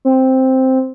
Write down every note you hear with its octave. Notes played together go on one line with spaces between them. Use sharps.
C4